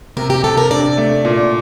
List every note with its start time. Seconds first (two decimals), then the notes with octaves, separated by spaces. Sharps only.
0.17 C3 A#4
0.30 G4
0.44 C3 A4
0.57 A#4
0.70 D4 D5
0.97 A3
1.25 A#2